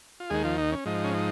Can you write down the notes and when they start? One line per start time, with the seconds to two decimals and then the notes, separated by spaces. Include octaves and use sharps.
0.20 F4
0.30 D#2 D#3 G#3 G#4
0.44 F3 F4
0.58 D#4
0.72 C#4
0.85 G#2 F3 D#4
1.04 C#4
1.14 D#4